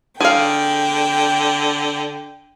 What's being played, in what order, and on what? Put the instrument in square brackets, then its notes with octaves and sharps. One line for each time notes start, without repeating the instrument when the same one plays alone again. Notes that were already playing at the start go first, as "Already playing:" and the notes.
[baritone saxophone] D3 [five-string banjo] G#4 F5 [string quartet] G5